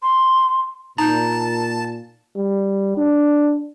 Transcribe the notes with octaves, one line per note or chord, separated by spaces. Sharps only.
C6
A#2 D#4 A5 A#5 G6
G3
D4